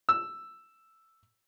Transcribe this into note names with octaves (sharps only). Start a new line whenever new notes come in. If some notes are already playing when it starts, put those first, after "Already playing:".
E6